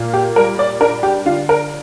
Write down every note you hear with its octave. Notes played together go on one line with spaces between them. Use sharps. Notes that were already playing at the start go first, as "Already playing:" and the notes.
Already playing: A#2 A#3
G4
G3 A#4
D5
D4 A#4
G4
D3 F4
A#4